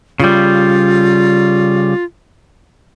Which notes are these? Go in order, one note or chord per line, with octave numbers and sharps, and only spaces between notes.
C#3 G3 F4